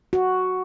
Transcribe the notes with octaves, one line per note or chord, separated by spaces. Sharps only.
F#4